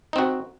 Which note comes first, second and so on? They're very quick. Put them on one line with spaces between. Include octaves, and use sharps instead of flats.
D#4 C4 F#4